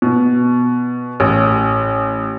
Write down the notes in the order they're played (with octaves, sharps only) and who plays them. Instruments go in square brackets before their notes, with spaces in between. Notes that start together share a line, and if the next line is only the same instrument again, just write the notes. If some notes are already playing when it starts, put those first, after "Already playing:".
[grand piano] B2
A1